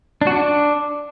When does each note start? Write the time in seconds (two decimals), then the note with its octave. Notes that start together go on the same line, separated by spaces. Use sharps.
0.21 D4
0.27 F#4
0.32 D4